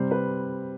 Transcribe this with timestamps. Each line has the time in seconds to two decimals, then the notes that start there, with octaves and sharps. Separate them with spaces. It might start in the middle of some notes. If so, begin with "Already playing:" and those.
Already playing: C3 G3 C5
0.11 B4